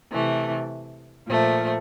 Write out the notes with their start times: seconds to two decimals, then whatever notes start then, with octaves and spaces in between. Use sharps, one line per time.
0.12 C3 E3 A3
1.27 A#2 F3 A3